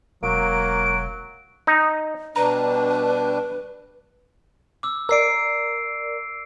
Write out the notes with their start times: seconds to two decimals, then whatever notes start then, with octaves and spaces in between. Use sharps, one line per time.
0.23 E1 F#3 A#3 D7
1.67 D#4
2.36 B2 G3 D4 B4 A#5
4.83 D6 E6
5.09 A#4 D5 E6 C7 D7